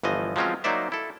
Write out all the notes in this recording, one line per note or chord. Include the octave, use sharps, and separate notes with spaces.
G1 E3 F3 D#5
F3 F#3 G#3 C4 C#4 F4
F#3 A#3 D#4 C5 D5 E5
E4 A4